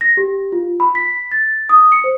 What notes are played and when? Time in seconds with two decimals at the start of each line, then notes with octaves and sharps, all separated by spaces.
0.01 A#6
0.17 G4
0.52 F4
0.80 B5
0.95 B6
1.32 A6
1.69 D#6
1.92 C#7
2.04 C5